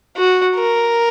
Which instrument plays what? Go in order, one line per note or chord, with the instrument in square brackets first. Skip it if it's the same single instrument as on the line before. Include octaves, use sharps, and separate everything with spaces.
[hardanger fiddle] F#4
A#4